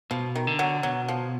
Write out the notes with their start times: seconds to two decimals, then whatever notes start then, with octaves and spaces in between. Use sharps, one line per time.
0.11 B2 F3
0.35 D#3
0.47 D3
0.59 F#3
0.83 B2 F#3
1.08 F3